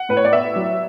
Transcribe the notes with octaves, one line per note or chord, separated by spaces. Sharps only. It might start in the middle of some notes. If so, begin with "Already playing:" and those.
Already playing: F#5
A2 B4
C#5
D5
B3 E5
F#3